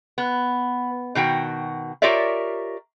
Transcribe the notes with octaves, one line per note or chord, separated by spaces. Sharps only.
B3
B2 D#3 F#4 G5
F4 G4 A#4 C#5 D5 E5